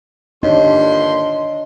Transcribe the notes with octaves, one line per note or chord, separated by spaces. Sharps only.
G2 A#2 D#3 D4 C#5 D#5 C6